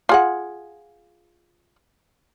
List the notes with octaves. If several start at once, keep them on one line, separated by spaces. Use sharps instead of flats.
F4 G#4 F#5